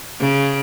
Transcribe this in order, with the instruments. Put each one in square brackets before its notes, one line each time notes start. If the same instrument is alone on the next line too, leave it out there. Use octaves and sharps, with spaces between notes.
[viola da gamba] C#3